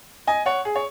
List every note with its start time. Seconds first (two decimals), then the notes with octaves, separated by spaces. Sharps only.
0.27 D#5 G#5
0.46 C#5 F#5
0.65 G#4
0.76 C#5